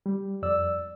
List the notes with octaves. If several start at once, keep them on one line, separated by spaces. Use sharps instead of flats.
G3
F2 D5 E6